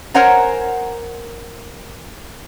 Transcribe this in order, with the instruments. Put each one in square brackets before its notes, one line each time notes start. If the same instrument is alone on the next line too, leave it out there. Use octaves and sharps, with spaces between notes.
[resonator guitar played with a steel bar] A#4 C5 C#5 F#5 G#5 A#5